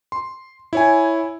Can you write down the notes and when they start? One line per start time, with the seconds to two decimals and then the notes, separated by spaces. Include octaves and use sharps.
0.12 C6
0.73 E4 C#5 G#5